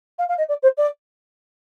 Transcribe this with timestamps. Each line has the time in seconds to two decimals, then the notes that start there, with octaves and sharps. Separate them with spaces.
0.18 F5
0.28 F5
0.38 D#5
0.48 D5
0.62 C5
0.77 D5